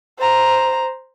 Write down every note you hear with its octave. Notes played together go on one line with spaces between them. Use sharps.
C5 A#5